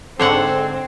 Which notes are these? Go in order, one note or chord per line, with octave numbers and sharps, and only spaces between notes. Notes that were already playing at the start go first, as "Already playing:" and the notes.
G#2 D3 C4 A4 C5 C#5 F#5